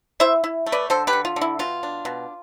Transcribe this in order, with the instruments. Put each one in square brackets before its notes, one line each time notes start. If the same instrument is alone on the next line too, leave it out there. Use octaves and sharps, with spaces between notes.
[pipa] E4 C5 E5
E4
A3
B4 D5
D3 A4 C5
G4 B4
D3
F4
D3
E4
B2 F4
D4
B2